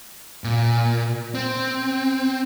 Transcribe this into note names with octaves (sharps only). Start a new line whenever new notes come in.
A#2
C4